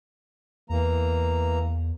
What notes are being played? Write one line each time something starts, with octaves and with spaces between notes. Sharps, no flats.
E2 E3 A#3 A#5